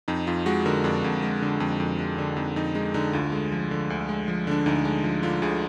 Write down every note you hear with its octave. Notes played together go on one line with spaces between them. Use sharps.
F2 D#4
F2 F4
G#3 F#4
D3 A#4
F2 D4
F2
G#3
D3
F2
F2
G#3
D3
F2 D#4
F2 D#4
G#3 D#4
D3 D#4
D2 F4
G#3
F3
D3
D2
G#3
F3
D3 D4
D2 D#4
G#3 D4
F3
D3 F4
D2 G#4